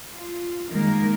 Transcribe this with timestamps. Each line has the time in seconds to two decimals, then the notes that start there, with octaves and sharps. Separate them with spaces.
0.13 F4
0.68 D#3 G#3 A#3 A#4